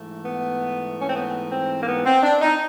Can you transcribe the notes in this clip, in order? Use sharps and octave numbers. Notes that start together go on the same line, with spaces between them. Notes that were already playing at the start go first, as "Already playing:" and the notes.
Already playing: G#2 E3 A3
B3
C#4
C4
B3
C4
A#3
B3
C4
D4
D#4